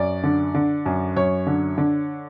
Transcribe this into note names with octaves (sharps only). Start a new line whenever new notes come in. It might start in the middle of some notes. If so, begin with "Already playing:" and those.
Already playing: F#2 D5
D3
D3
F#2
F#2 C#5
D3
D3